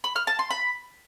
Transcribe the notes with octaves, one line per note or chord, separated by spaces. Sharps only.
B5
F6
A5
C6
B5